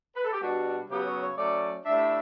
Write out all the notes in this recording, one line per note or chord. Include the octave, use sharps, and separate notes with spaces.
B4
A4
G4
B2 G3 D4 F#4
C#3 F#3 B3 G4
C#5
C#5
F#3 A3 C#4 D5
A2 G3 D4 E5